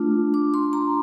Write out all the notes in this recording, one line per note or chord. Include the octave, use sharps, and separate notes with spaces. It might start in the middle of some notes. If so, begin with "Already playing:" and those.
Already playing: A3 D4 F4
D6
C6
A#5